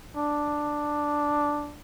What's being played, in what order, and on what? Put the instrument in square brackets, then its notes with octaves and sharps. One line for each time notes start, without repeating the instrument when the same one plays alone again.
[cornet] D4